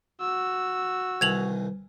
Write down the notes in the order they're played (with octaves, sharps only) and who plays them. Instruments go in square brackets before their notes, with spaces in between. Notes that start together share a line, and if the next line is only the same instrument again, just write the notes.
[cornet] F#4 [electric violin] E6
[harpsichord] C2 D#3 E3 [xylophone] G#6 F7 F#7